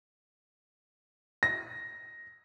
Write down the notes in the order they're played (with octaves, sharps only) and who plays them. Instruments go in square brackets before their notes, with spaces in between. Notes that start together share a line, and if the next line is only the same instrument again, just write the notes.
[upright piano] A#6